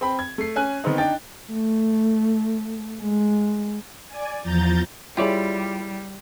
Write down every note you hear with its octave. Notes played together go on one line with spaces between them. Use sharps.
C4 G5 B5
G#6
A3 C7
C#4 G#5 F#6
D#3 B3 C4 D#4
D4 D#4 G5 A6
A3
G#3
D5 G#5
E2 F3 A#5 G6 A6
G3 E4 F4 G4 G#4 C#5 D5 G5